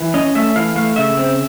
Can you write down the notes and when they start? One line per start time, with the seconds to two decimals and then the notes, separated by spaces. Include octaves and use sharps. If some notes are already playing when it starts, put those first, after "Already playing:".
Already playing: E3
0.14 C#4 D#5
0.35 A3 E5
0.55 E3 F5
0.76 A3 F5
0.96 C#3 E5
1.17 C4